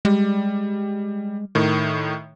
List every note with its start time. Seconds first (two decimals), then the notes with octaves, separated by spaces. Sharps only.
0.05 G3 G#3
1.55 A2 D#3